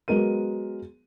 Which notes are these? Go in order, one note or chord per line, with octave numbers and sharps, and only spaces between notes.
F#3 G#3 B3 A#4 D#7